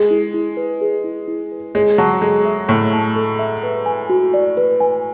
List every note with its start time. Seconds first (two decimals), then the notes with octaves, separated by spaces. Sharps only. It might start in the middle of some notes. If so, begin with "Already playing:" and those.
Already playing: G#3 G#4
0.11 E4
0.34 E4
0.57 B4
0.81 G#4
1.04 E4
1.28 E4
1.52 B4
1.75 G#3 C#5
1.98 F#3 A5
2.22 G#3 A4
2.45 E5
2.68 A2 C#5
2.93 A5
3.16 A4
3.39 E5
3.63 B4
3.86 G#5
4.10 F#4
4.34 D5
4.57 B4
4.80 G#5